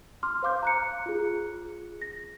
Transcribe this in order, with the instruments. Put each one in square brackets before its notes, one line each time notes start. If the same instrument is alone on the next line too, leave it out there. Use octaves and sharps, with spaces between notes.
[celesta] C6 D6 F6
C5 F5 D6 G6
A#5 F#6 C#7
F4 G#4
A#6